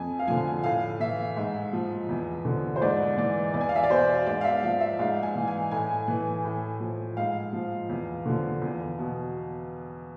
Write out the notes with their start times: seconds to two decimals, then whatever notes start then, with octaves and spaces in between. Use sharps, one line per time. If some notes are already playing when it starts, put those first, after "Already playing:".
Already playing: F2 G#5
0.19 F5
0.28 D3 F3 G#5
0.63 A2 F5
1.00 E3 E5
1.36 G#2
1.73 F3
2.09 E2
2.45 D3 F3
2.76 C5
2.82 G#2 D5
3.17 E3 D5
3.54 E2 D5
3.61 G#5
3.69 F5
3.76 E5
3.83 D5
3.90 B2 C5
4.26 G#2 D5
4.41 F5
4.44 E5
4.63 F3 F5
4.81 E5
4.99 G#2 F5
5.23 G#5
5.35 E3
5.48 G#5
5.71 A2 G#5
6.08 E3
6.44 A2
6.80 F3
7.17 G#2 F5
7.53 F3
7.89 E2
8.25 D3 F3
8.62 E2
8.98 B2